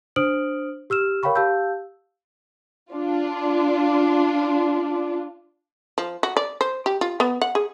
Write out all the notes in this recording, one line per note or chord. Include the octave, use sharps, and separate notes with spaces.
D4 C5 D#6 F6 D7 F#7
G4 E6 F6 E7
A#4 C#5 F5 G5 B5 C#6
G4 F5 A5 E6 G6
D4 F4
F3
F#4
D5
C5
G4
F4
B3
F#5
G#4